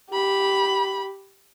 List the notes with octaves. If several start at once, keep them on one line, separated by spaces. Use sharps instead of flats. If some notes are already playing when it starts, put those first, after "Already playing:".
G4 B5